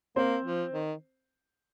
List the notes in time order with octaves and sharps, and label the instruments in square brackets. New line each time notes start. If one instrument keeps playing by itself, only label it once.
[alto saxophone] A#3 [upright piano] C4 C5
[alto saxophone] F3
D#3